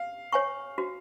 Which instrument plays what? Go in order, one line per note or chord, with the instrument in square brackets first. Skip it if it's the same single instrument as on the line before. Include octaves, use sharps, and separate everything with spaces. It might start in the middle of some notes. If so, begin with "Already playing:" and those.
Already playing: [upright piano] F5
[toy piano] C#5 G#5 C#6
F#4